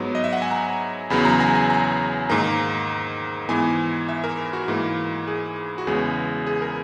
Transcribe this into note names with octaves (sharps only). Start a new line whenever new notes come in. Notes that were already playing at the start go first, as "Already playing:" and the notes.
Already playing: G#2 F#3 B3
D#5
E5
F#5
G#5
A#5
E2 C#3 F#3 B3 B5
A#5
G#5
G#5
A#5
G#2 D#3 A#3 A#5
G#2 E3 B3 G#5
E5
A#4
F#4
G#2 E3 A#3
G#4
F#4
E2 C#3 G#3 B3 G#4
G#4
A#4